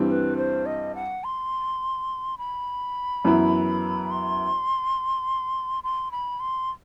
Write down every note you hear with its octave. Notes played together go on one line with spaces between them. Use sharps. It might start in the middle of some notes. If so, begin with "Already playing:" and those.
Already playing: G2 E3 G3 C4
B4
C5
D#5
F#5
C6
B5
F#2 E3 B3 E4
C6
C6
B5
C6